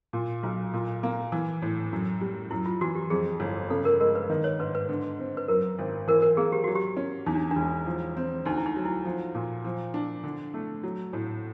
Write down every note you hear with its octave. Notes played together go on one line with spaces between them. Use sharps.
A#2
B1
A#2
A#3
E3
A2
F#2
G3
F#2 E4
F4
E3 F#4
G4
F2 G#4
G1
C#3 A4
A#4
G#3 A#4
B4
D#3
B4 C#5
G#2 B4
B4
D3
C4
B4
F#2 A#4
G#1
E3 A#4
A#4
A#3 G#4
G4
F#3 F#4
G4
C#4
E2 D#4
D4
D4
E1
F3
C4
D2 D#4
E4
D#4
F#3
E4
F3
A#2
F3
D4
D3
A3
F#3
A2